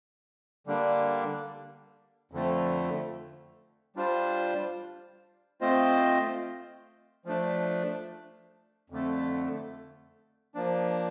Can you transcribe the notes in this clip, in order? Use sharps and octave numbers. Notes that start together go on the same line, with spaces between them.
D3 G3 A#3 D4
F2 D3 F3 A3
G3 D4 F4 C5
A3 C4 F4 C5 D#5
F3 A3 D4
F2 D3 A3
F3 A#3 D4